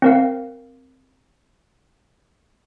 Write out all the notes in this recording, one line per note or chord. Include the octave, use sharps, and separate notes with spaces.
C4 A#4 F5